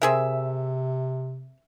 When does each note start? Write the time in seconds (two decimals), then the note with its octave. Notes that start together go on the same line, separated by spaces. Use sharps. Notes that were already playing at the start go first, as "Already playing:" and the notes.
0.02 C3 C4 G#4 A#4 E5